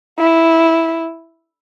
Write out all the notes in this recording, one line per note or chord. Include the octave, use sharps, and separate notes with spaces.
E4